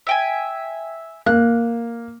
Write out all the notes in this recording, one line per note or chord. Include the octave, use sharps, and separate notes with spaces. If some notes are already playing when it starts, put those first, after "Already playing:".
E5 G5 G#5
A#3 F#6